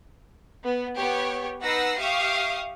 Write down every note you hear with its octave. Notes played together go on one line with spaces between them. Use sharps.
B3
B3 G4 C#5
D#4 B4 F#5 E6 A#6 C7
G4 E5 F5 C#6 D#6